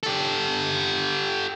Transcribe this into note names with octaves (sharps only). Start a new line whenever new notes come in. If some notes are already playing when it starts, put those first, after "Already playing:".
G4 A4